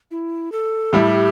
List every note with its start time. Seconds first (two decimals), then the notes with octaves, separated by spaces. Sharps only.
0.11 E4
0.52 A4
0.93 A2 G3 E4 G4